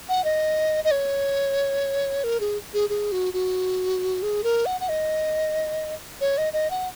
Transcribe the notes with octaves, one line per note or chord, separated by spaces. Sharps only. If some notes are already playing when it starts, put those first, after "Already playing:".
F#5
D#5
D#5
C#5
A#4
G#4
G#4
G#4
F#4
F#4
G#4
A#4
F#5
F#5
D#5
C#5
D#5
D#5
F#5